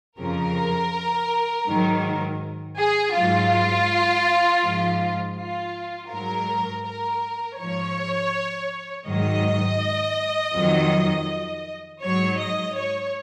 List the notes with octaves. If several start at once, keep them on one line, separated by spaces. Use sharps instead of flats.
F2 C#3 F3 A#4
G#2 D#3 F#3
G#4
G#2 F#3 F4
G#2 F3
F4
G#2 F#3 A#4
A#4
G#2 F3 C#5
G#2 D#3 F#3 D#5
F2 D#3 F#3
G#2 F#3 C#5
D#5
C#5